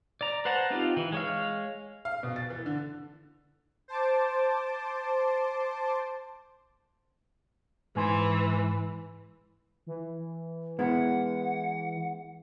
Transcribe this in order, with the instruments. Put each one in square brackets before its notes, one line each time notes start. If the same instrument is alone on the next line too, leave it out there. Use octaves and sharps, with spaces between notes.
[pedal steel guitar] D5 A#5
B4 C5 F#5 A5 A#5
C4 D#4 F4 G4
E3
G#3 C#5 F5
[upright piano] F5
B2
A6
E3
D3
[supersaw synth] C5 A5 D6
[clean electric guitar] G#2 G#5 C6 [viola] E3
[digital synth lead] E3
[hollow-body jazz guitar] G#3 B3 E4 [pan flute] F#5